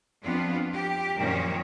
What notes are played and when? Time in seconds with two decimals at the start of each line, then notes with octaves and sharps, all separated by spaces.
0.23 F2 B3 D4 F4
0.73 G4
1.17 F#2 A#2 D#3 F3 C#4